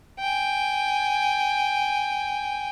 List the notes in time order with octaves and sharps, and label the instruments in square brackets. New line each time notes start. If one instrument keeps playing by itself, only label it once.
[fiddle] G5 G#5